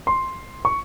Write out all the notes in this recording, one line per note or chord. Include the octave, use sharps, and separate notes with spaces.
C6
C#6